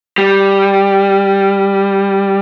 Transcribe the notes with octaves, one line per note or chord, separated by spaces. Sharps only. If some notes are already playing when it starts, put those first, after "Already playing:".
G3